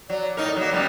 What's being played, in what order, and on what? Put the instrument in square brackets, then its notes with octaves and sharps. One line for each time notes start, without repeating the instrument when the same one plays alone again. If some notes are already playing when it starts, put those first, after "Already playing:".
[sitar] F#3 [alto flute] D5
[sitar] A2 D#4 A#4
F#3 A#3
F#2 G3 B3